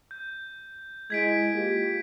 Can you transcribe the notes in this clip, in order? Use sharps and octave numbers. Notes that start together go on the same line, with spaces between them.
G6
G#3 E4 G#6 B6 D7
A#3 F4 G4